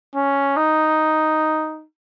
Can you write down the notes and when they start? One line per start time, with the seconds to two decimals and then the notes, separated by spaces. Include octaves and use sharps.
0.15 C#4
0.57 D#4